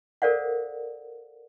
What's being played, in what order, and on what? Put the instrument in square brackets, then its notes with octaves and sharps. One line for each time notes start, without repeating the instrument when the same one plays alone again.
[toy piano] A4 A#4 C5 D5 F5 F#5